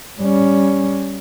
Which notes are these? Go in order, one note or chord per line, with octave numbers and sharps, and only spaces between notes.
G3 C#4